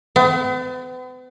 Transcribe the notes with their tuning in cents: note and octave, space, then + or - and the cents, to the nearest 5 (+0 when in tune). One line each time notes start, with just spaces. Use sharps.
B3 +45